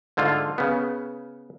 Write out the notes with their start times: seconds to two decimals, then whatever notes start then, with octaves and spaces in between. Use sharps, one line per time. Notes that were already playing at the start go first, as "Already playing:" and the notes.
0.17 G#2 D3 A3 F4
0.58 C#3 B3